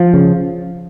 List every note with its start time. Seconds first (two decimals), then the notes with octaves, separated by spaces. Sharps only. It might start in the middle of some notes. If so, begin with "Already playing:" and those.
Already playing: F3
0.14 C#3